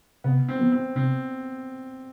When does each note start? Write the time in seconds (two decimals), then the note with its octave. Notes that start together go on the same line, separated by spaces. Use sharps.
0.24 C3 B3
0.49 C4
0.59 F3 B3
0.72 C4
0.95 C3 C4